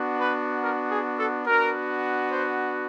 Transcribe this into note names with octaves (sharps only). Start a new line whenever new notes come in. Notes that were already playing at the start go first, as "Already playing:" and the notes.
Already playing: B3 D4 F#4
B4
A#4
G#4
A4
B3 D4 F#4 A#4
C5